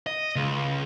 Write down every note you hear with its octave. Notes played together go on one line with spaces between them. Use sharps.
D#5
C#2